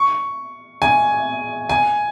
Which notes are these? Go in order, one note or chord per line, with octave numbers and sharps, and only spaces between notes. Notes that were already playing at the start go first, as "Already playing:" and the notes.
Already playing: C#6
G#5
G#5